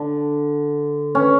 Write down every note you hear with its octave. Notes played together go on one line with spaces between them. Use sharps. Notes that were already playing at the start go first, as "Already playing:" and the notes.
Already playing: D3
C#4